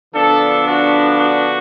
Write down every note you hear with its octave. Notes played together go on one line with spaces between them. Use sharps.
D3 F3 B3 D4 A4
F#4
F#4